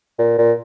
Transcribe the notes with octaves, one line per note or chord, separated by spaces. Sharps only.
A#2
A#2